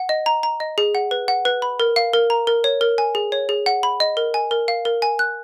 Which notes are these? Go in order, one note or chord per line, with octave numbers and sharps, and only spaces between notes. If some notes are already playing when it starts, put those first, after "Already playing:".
Already playing: F#5
D#5
A#5
A#5
D#5
G#4
F#5
B4
F#5
B4
B5
A#4
F5
A#4
A#5
A#4
C#5
A#4
G#5
G#4
C#5
G#4
F#5
B5
D#5
A#4
G#5
A#4
F5
A#4
G#5
F#6